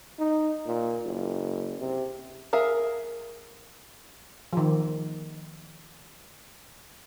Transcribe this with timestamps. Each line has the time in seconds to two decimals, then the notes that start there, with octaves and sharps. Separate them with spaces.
0.19 D#4
0.66 A#2
1.05 F#1
1.80 C3
2.53 G#4 A#4 E5 F5
4.53 D#3 F3